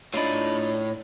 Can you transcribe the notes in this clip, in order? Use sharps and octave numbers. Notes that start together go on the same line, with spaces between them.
A2 D4 D#4 F4 C#5 B5